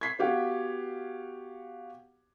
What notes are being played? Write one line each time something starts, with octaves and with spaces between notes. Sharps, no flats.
G#6 B6 C7
B3 F#4 G4 F5 F#5